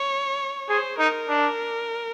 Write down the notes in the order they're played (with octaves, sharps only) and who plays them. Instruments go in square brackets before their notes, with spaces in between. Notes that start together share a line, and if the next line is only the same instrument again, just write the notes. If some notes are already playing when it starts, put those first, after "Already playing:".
Already playing: [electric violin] C#5
[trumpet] G#4 [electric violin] C5
[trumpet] D#4 [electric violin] A#4
[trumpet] D4